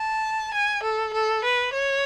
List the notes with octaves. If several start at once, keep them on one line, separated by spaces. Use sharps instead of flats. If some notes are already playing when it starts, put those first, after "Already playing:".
Already playing: A5
G#5
A4
A4
B4
C#5